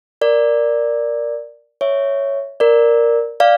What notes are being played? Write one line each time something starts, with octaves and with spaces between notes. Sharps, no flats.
A#4 D5
C#5 E5
A#4 D5
D5 F5